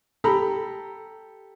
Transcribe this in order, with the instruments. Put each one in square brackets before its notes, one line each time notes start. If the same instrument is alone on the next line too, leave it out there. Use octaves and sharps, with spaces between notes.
[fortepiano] G4 A4 A#5 B5